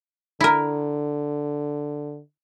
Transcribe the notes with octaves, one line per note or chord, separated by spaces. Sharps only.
D3 E4 A#4